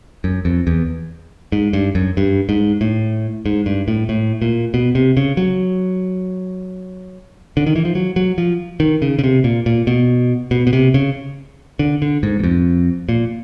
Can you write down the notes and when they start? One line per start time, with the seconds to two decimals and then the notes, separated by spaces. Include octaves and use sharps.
0.24 F#2
0.45 F2
0.67 E2
1.52 G#2
1.73 G2
1.95 F#2
2.17 G2
2.49 G#2
2.81 A2
3.46 G#2
3.66 G2
3.88 A2
4.09 A2
4.42 A#2
4.74 B2
4.95 C3
5.17 C#3
5.37 F#3
7.57 D3
7.66 D#3
7.76 E3
7.85 F3
7.95 F#3
8.16 F#3
8.38 F3
8.80 D#3
9.02 C#3
9.19 C#3
9.24 C3
9.44 A#2
9.66 A#2
9.87 B2
10.51 B2
10.67 B2
10.73 C3
10.94 C#3
11.79 D3
12.02 D3
12.23 G#2
12.39 E2
12.43 F2
13.09 A#2